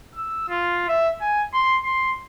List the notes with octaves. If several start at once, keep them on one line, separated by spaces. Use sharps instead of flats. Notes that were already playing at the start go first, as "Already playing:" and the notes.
E6
F4
E5
G#5
C6
C6